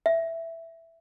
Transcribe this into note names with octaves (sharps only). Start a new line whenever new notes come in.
E5